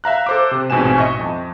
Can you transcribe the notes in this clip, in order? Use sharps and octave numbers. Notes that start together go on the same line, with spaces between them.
E5 F5 A#5 F#6
A4 C5 D6
C3
A1 G#2 B2 C4 G#5 E7
D#5 E5 C#6
F2